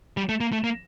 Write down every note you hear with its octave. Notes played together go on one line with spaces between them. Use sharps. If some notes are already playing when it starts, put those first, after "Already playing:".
G3
A3
A#3
A3
A#3